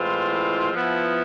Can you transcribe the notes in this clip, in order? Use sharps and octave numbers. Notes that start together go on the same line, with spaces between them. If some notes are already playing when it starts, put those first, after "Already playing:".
Already playing: A2 E3 G#3 C4 F4
F3 B3 E4